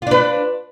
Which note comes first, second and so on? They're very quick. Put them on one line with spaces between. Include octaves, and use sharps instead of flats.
F4 D4 B4